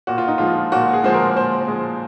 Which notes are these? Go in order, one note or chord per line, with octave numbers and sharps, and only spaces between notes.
A#2 F#4
F4
D#4
F3 G#3 F4
A#2 F#4
G#4
F3 G#3 C5
A#4
A#2 C5
F3 G#3